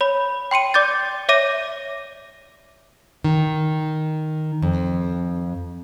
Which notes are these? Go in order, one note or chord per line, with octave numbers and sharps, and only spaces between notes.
C#5 B5
G5 C6 C#7 D#7
D5 D6 G6 A6
C#5 E5 D6 A#6 D#7
D#3
F2